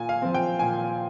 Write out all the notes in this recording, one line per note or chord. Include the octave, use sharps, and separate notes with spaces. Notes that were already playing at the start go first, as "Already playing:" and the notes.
Already playing: A#2 G#5
F5
F3 C4
G5
A#2 G#5